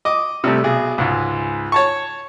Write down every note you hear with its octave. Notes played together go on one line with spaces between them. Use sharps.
D#5 D6
C3 G3 A3
B1 G#4
C#2 G#2
C#5 A5 C#6